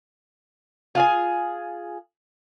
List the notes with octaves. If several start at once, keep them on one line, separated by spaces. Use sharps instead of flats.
F4 G#4 G#5